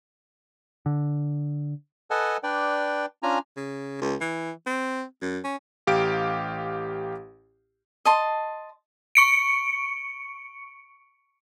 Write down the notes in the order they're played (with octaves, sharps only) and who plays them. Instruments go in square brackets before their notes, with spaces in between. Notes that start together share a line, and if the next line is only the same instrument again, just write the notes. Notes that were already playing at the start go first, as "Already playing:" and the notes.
[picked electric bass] D3
[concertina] A4 B4 D#5 F#5 G#5 A5
D4 B4 D5 G5
C#4 D4 F4 G#5 A#5
[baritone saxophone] C#3
C#2
E3
C4
F#2
C#4
[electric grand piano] A1 G4 F5 D7
[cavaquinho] D#5 A5 C6
[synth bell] C#6 C#7 D7